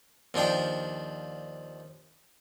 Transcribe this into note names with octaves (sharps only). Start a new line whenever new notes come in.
D#2 F3 D4 G5